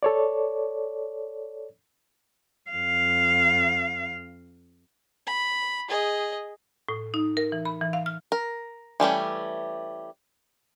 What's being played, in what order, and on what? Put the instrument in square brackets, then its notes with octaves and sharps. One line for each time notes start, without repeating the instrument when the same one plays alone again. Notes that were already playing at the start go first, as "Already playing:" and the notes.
[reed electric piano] A4 C#5 D5
[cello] F2 F5
[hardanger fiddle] B5
G#4 D#5
[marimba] A2
D#4
A#4
E3
B5
E3
F5
F6
[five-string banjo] A#4
E3 G3 A3 C#4